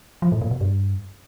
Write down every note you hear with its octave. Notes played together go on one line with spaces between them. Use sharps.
F3
A2
A#2
B2
G2